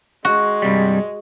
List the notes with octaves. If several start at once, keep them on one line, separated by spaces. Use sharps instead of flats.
G#3 F#4
G2 C3 G3